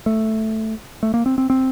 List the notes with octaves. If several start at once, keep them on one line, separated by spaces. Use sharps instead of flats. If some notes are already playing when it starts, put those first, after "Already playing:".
A3
A3
A#3
C4
C4
C4